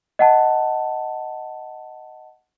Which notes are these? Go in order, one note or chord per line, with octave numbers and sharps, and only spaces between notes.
D#5 F#5 A5